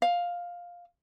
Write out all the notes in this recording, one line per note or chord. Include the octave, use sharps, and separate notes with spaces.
F5